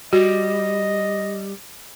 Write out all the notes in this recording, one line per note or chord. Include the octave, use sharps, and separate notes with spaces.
G3 F#4 D#5